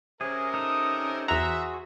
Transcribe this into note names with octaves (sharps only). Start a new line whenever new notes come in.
C3 C#4 G#4 A#4
D#4 A4 D#6
E2 F#4 G#4 C5 E5 F#5 A#5